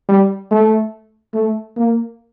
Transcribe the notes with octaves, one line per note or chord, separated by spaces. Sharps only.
G3
A3
A3
A#3